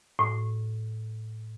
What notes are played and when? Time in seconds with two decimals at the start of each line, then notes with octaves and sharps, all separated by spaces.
0.19 A2